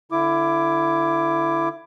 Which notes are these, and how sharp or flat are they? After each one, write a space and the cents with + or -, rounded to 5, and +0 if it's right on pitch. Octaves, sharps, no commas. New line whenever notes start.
D3 +0 E4 +20 D6 +0